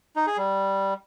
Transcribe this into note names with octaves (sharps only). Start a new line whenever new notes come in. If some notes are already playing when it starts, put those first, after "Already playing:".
D#4
G#4
G3